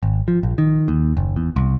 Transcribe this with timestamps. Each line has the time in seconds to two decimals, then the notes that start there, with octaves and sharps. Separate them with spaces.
0.03 G#1
0.28 F3
0.43 A#1
0.58 D#3
0.88 D#2
1.17 F#1
1.36 E2
1.56 C2